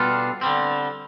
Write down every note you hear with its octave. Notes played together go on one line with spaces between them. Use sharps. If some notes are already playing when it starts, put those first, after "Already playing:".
Already playing: B2 G3 D4 F4 A4
D3 G3 C4